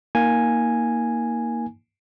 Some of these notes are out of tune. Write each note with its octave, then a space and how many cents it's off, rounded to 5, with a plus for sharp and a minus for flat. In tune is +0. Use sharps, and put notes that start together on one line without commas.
A#3 +5 D#4 +30 G#5 -5